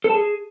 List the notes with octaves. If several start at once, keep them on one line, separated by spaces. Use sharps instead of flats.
A4
A5
G#4